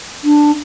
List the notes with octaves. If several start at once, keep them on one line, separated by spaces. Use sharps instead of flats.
D4